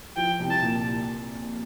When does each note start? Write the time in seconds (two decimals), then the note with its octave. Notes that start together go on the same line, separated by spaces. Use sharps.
0.16 F3 G5
0.39 C2
0.50 A5
0.62 A#2